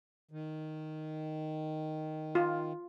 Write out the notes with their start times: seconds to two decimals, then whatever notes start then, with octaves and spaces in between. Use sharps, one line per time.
0.31 D#3
2.35 F4